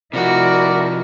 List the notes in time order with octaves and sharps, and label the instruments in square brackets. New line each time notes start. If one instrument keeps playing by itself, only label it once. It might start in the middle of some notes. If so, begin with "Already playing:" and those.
[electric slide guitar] C3 F3 [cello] E4 D#5 [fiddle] F#4 [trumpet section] A#4 D5